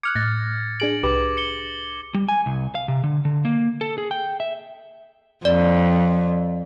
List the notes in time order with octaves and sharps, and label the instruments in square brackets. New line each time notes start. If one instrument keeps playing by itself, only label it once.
[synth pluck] D6 F6 F#6 [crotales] G#6 C#7
[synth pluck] A2 [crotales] A6 A#6
[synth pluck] D4 G#4 D7 [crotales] F#7
[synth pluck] C2 G4 B4 [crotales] D6 F#7
[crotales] C#7 G7
[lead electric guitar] G3
G#5
C2
F5
C3
D3
D3
A#3
A4
G#4
G5
E5
[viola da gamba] F2 [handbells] D5